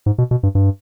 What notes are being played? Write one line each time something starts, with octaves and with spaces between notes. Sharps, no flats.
G#2
B2
B2
G2
G2